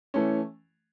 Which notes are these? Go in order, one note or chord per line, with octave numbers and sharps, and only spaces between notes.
E3 A3 C#4